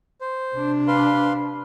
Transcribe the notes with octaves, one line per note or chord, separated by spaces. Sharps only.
C5
C3 D4
B4 F5 C6